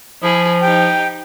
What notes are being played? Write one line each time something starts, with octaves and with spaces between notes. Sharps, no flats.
F3 E4 G#4
D#4 G4 G5